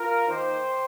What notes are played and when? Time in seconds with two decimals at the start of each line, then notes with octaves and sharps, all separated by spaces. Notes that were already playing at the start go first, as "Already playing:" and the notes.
Already playing: F4 A#4
0.28 D#3 A#3 D#4 G4 C5